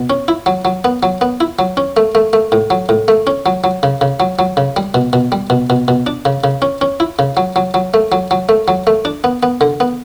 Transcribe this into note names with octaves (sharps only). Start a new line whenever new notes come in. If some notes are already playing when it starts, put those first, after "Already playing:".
Already playing: B2
C#4
E4
F#3
F#3
B3
F#3
B3
E4
F#3
C#4
A3
A3
A3
A2
F#3
A2
A3
C#4
F#3
F#3
C#3
C#3
F#3
F#3
C#3
G3
B2
B2
G3
B2
B2
B2
D4
C#3
C#3
C#4
C#4
E4
C#3
F#3
F#3
F#3
A3
F#3
F#3
A3
F#3
A3
D4
B3
B3
D3
B3